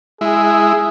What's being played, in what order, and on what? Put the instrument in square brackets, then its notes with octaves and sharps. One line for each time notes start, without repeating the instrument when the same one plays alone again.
[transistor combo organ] G#3 E4 [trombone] G#4